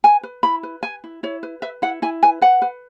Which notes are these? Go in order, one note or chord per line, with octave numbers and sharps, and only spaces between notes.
B4 G#5
B4
E4 B5
B4
B4 G#5
E4
E4 C#5
B4
B4 E5
E4 F#5
E4 G#5
B4 G#5
B4 F#5
B4